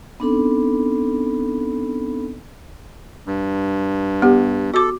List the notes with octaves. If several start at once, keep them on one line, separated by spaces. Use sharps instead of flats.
B3 C4 D4 D#4 A4 B5
G2
B3 G4
F#4 A4 D6